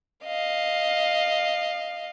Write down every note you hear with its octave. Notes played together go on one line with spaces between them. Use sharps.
D#5 F5